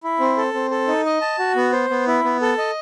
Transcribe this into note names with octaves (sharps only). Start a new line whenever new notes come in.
E4
C4
A4
C4
A4
D#4
D#5
A5
F#4
B3
C5
B3
E4
B3
A4
D#5